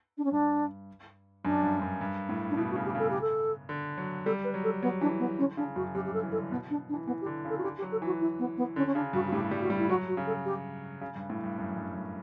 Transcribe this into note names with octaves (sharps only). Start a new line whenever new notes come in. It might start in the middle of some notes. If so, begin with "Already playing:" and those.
D4
C#4
G2 D4
F#2 D4
G2
F#2
G2
A2
D4
B2 E4
F#4
C#3
G4
C#3
A4
G4
A4
D3
F#3
G3 A4
B4
F#3
A4
F#3 B3
E3 D4
B3
D3 C#4
C#3 D4
F#2 F#4
F#2 G4
G2 G4
A4
E3
A4
D3
B2 B3
D4
D4
E3
E3 B3
G4
D3
C#3
A4
F#4
D3 G4
G4
F#3
A4
E3 F#4
E4
B3
B3
D3 C#4
C#4
C#3 D4
G2 F#4
F#4
A2 G4
G3
F#4
G3
E4
F#3 F#4
F#4
C#3
A4
G4
C#3
G2
A2
G2
F#2
G2
G2